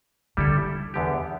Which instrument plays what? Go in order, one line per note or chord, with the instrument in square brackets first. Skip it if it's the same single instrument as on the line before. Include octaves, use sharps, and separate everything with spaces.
[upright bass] D3 [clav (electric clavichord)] G3 E4 A4
[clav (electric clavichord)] E2 D3 B3 G4